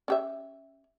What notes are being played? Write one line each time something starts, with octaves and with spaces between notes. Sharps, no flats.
C#4 G4 E5